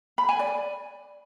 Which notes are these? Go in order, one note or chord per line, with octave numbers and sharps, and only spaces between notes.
B5
G#5
D5